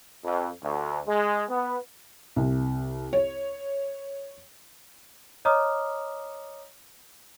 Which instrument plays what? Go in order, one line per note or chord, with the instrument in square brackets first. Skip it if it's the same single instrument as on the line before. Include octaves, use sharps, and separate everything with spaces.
[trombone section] F2
D2
G#3
B3
[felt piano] C2
C#5
[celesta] C#5 D#5 A#5 D6 D#6 F6